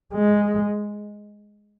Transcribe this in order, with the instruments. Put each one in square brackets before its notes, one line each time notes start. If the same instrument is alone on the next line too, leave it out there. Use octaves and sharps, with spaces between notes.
[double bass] G#3